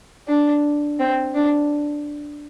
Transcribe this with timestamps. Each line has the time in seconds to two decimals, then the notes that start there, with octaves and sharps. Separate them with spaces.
0.28 D4
0.99 C4
1.35 D4